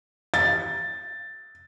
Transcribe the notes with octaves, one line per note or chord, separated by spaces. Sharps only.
A6